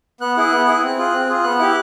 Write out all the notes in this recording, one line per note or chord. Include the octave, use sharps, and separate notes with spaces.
B3 F#6
E4 G#4
B3
E4 G#4
C4
F4 G#4
C4
F4 G#4
B3 F#6
E4 G4